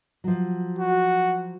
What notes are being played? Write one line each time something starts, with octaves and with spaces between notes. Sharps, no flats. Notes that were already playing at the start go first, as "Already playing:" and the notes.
F3 F#3
F#4